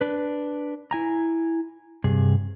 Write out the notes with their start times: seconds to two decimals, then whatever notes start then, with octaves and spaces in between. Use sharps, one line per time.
0.01 D4 B4
0.91 E4 G#5 A#5
2.04 G2 C3 G#4